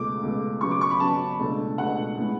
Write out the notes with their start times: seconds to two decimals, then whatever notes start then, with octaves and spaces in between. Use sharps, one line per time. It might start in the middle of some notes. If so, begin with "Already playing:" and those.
Already playing: C#2 B2 A3 D6
0.22 C#2 B2 A3
0.61 C#3 F#3 B3 C#6
0.71 D6
0.81 C#6
0.91 B5
1.00 C#3 F#3 B3 A5
1.39 C#2 B2 A3 D4
1.78 C#2 B2 A3 D4 F#5
2.17 A2 G#3 B3